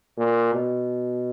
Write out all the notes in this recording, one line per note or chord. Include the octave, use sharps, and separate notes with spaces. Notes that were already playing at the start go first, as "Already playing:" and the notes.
A#2
B2